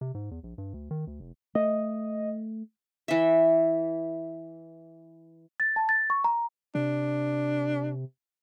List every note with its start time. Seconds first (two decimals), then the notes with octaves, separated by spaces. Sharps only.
0.01 C3
0.15 G#2
0.31 E2
0.43 A#1
0.58 G2
0.74 D2
0.91 D#3
1.07 D2
1.20 F1
1.55 A3 D#5
3.08 E3 E5
5.60 A6
5.76 A5
5.89 A6
6.10 C#6
6.24 A#5
6.75 C3 D4